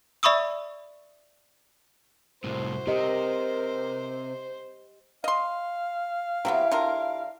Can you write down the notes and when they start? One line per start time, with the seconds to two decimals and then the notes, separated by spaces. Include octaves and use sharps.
0.23 D5 E5 B5 C#6 D#6 E6
2.44 F#1 C2 A2 E4 F#4 C5
2.87 C3 G4 A#4 D#5
5.24 D#5 F5 C6
6.45 C3 F#3 B3 E4 G4
6.72 D3 F4 A#4